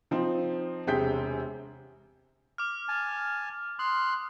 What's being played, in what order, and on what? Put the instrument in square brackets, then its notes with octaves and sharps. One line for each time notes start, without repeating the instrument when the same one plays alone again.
[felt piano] F3 C4 D#4
E1 C3 G#4 G5 G6 B6
[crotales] D6 F6
[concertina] G#5 A5
[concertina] C6 F#6 [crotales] D#6